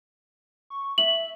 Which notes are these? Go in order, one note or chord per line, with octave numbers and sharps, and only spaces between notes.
C#6
E5 F#7